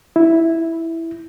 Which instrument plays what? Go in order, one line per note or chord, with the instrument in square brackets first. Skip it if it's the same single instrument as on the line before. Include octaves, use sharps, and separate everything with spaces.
[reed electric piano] E4